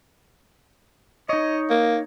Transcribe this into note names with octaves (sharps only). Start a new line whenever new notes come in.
D#4 C#5 D#5
A#3